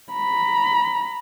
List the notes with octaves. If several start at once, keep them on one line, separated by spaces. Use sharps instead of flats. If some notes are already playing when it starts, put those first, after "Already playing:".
A#5 B5